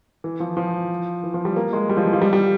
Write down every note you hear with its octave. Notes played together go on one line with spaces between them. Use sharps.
E3
F3
F3
E3
F3
G3
A#3
G#3
G3
F3
E3
F3
G3
G3